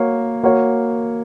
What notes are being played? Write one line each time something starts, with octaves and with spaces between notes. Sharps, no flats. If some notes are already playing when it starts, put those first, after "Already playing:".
Already playing: A#3 F#4 A#4 C#5
A#3 F#4 C#5